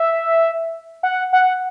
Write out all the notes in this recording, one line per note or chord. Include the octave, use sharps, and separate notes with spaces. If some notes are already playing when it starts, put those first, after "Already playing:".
Already playing: E5
F#5
F#5